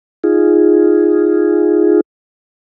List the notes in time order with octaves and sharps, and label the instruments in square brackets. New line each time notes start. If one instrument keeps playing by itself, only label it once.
[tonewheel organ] D#4 F4 G#4